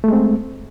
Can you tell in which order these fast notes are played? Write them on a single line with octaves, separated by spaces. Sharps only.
A3 G#3 C4